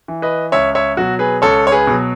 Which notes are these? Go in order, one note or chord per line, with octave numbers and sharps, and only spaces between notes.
E3
B4 D#5
C#2 C#5 E5
C#5 E5
B2 F#3 F#4
G#4 B4
C#2 A4 C#5
C#5
G#4 B4
B2 F#3